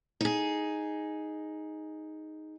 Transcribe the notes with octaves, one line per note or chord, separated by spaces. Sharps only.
D#4 G#4